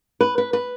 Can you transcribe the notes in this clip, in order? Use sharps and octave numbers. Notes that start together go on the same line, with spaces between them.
B4
B4
B4